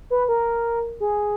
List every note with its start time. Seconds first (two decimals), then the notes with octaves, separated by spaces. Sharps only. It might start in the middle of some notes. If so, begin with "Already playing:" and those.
0.10 B4
0.29 A#4
1.00 G#4